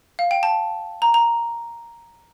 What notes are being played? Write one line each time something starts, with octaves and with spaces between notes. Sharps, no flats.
F5
G5
A5
A#5
A#5